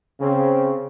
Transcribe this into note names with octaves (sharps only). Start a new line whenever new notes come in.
C#3 C4